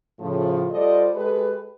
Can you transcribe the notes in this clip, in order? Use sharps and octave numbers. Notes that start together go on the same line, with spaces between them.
A2 C#3 F3
G3 F4 A4 C5 D5 D#5
G#3 G4 A4 B4